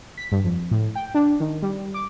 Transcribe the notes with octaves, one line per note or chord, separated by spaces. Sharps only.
B6
G2
F2
A2
G5
D4
D#3
G3
D6